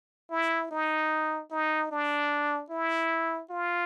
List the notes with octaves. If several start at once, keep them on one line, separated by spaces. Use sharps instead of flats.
E4
D#4
D#4
D4
E4
F4